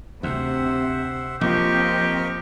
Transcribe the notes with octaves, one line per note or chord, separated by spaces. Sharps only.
D2 C3 C5 E5 F#5
A#1 F3 C4 G4 A#4 D#5 C#6